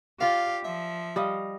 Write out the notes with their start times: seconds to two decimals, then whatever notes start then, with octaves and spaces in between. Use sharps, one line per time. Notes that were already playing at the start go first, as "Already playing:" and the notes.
0.21 F4 G4 D5 F5
0.65 F3 E5
1.16 G3 D#5 F5